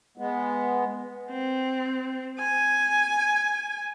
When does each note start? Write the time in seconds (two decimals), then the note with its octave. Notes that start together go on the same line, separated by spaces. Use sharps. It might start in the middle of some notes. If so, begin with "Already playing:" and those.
0.18 G#3 B3
1.31 C4
2.39 G#5